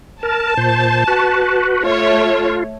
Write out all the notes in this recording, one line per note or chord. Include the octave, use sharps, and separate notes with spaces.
A#4 A5
A#2 C5
F#4 B4
A3 F4 C#5